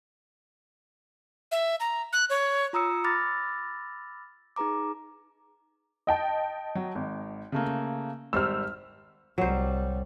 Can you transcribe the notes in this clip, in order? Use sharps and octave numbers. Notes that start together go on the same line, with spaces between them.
E5
A#5
F#6
C#5
F4 A#5 D#6 E6 C#7
B5 D6 E6 F6 A6 A#6
D#4 G#4 B4 A#5 D6
D#5 G5 A5
F#3
G#1
C#3 A3 A#3
G#1 G3 C5 E6 F6
C2 F#3 G3 C5